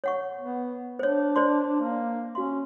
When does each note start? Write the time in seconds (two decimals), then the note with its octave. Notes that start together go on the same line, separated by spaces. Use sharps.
0.04 C#5 F#5 C#6
0.41 B3
0.99 D4 C5 C#5
1.36 C5 D5 C6
1.81 A#3
2.35 C#4 F#4 F5 C6